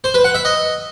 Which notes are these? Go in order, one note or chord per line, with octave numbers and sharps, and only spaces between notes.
C5
B4
F#5
E5
D#5